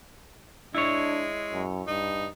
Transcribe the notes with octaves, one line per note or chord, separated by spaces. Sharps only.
G#3 D4 E4 C#5
F#2
G2 D#4